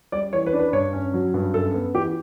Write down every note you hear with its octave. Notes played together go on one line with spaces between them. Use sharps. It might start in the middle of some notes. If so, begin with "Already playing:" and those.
G3 D5
E3 C#5
B4
D4
B4
G2 C#5
C#4
F#3
G2
F#2 A4
B3
E3 G4